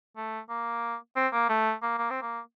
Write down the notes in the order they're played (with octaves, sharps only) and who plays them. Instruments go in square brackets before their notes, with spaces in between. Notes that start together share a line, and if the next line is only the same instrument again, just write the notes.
[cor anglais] A3
A#3
C4
A#3
A3
A#3
A#3
C4
A#3